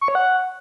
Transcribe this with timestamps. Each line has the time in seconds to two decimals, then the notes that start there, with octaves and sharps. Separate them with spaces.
0.01 C#6
0.08 C#5
0.15 F#5